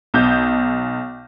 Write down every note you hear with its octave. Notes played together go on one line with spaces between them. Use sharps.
B1 G6